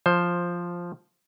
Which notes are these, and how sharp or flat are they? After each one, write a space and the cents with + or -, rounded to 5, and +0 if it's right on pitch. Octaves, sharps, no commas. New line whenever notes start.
F3 +0 C5 +10